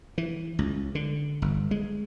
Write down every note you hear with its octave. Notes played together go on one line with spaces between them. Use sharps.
E3
C#2
D3
G1
G#3